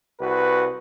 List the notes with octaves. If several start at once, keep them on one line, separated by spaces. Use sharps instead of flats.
C2 F#4 B4